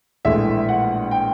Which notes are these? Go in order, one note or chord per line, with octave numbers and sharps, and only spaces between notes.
A#1 A2 E3 G#3 E5
F#5
G5